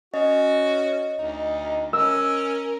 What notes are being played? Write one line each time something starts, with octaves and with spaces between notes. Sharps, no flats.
C#4 F#4 D#5
D2 D#4
C#4 A#4 E6